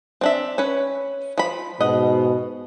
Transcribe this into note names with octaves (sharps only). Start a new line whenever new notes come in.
C4 D4 E5
C#4 B4
F3 B5
G#2 B2 D#5 F#5